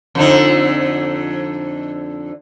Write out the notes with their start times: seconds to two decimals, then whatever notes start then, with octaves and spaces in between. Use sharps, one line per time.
0.15 F2 D3 D#4